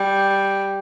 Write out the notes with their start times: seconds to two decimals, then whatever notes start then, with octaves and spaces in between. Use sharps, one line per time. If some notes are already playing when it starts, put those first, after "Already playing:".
Already playing: G3